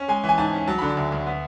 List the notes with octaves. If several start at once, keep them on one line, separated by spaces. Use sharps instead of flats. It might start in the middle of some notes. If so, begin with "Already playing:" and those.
Already playing: C#4
G#3 G#5
E3
G#5
G#2 A5
C#4
F#3 A5
D3 B5
A5
D2
D2
B3